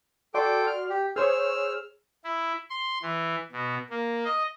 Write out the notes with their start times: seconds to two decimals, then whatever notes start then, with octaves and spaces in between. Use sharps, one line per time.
0.34 F#4 A4 D5 G5 C6 D6
0.67 F6
0.90 G4
1.16 G#4 C5 C#5 E6 F6
2.24 E4
2.70 C6
3.02 E3
3.52 B2
3.90 A#3
4.25 D#5